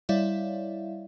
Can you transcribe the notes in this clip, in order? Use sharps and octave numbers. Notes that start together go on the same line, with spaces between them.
G3 E4 C#5 D5 E5 F5